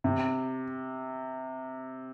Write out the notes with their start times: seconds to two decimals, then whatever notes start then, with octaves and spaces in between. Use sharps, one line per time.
0.04 C3